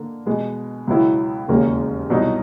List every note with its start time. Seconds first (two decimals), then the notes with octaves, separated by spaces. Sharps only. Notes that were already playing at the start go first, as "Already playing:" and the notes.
Already playing: D3 A#3
0.26 B2 G#3 B3
0.87 C#2 B2 F#3 B3 E4
1.48 E1 D#2 C#3 F#3 A#3
2.10 C2 B2 F#3 B3 D#4